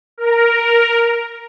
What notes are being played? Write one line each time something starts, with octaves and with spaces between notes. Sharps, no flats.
A#4